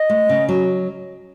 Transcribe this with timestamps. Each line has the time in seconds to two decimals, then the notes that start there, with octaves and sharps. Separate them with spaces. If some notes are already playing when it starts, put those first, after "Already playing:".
Already playing: D#5
0.10 A3
0.29 C#3
0.49 F#3